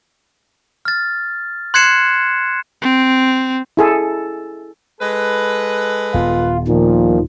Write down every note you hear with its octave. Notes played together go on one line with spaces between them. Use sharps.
F6 A6
C6 F#6 G#6 C7 C#7 E7
C4
E4 G#4 A4
G#3 A4 B4
D#1 B3 F4
A#2 D#3 F3